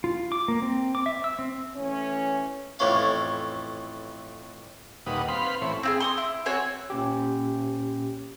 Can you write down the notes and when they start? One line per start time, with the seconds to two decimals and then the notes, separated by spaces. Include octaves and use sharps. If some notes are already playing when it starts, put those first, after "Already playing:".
0.04 F4
0.32 D6
0.48 A#3
0.62 C4
0.95 D6
1.06 E5
1.24 E6
1.39 C4
1.75 E3 A3 C#4
2.79 F2 A2 E3 C#4 F5
5.06 D#2 A#2 G3 B4 F#5 D#6
5.28 C4 B4 F5 B5 C6
5.62 A2 E3 C4 C#5
5.83 C4 E4 G#4
6.00 C6 C#6 D#6
6.18 E4
6.46 C4 F#4 C#5 G#5
6.90 A#2 C#4 G4